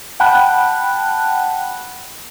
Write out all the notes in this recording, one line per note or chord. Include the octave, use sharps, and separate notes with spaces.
F#5 G5 A5 B5 F#6